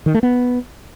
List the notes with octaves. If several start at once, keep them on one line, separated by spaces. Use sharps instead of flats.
D#3
A3
B3